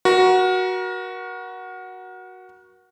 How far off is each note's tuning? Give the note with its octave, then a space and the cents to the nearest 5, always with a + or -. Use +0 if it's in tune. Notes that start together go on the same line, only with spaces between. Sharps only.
F#4 +0 A#4 +35